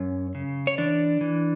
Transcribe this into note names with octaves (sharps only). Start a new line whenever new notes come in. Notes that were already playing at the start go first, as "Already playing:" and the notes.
Already playing: F#2 C#4 C#5
C#3
C#5
E3 D4 D5
E3